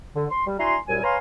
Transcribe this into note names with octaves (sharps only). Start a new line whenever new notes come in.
D3
C6
G3
D4 E4 F#4 G#5 A#5 C6
C2 F#2 A#2 G3 G#5
B4 C#5 F5 G#5 A#5 C6